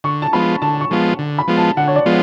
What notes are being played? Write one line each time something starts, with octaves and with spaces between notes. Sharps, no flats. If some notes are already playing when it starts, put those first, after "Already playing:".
D3 C#6
A5
F3 G#3 B3 F4 B5
D3 A5
C#6
F3 G#3 B3 F4
D3
B5
F3 G#3 B3 F4
A5
D3 F#5
C#5
D5
F3 G#3 B3 F4